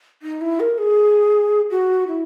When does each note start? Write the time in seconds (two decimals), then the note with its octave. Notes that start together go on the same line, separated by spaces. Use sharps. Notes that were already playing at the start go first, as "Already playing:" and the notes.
0.22 D#4
0.41 E4
0.60 A#4
0.78 G#4
1.71 F#4
2.08 E4